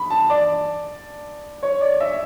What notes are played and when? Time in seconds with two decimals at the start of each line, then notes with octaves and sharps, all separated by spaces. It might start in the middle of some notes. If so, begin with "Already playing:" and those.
Already playing: B5
0.10 A5
0.30 D5
1.63 C#5
1.81 D5
2.01 E5